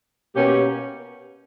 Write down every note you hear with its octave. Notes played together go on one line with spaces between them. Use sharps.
B2 A#3 C#4 G4